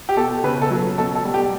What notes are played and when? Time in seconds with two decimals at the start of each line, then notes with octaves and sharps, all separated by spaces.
0.09 G4
0.16 B2 A4
0.44 C#3 B4
0.62 A4
0.71 F#3
0.98 B2 A4
1.15 A4
1.25 G3
1.34 G4